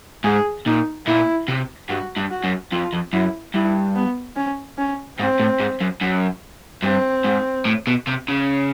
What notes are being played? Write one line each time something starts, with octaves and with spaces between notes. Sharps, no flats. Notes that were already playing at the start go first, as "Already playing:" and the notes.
G#2 G#4
A#2 D#4
A#2 E4
C3
G2 F#4
G2
F#4
F#2
F2 F4
F2
F#2 E4
G2 E4
B3
C#4
C#4
G#2 C4
A2
G#2
F#2
F#2
G2 C4
G#2
A2
B2
C3
C#3